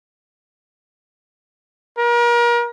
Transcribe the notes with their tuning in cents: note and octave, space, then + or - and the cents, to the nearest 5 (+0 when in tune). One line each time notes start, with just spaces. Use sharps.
A#4 +35